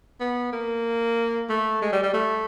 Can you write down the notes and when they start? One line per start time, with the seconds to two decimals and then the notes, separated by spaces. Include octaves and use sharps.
0.20 B3
0.53 A#3
1.49 A3
1.82 G#3
1.92 G3
2.03 G3
2.13 A3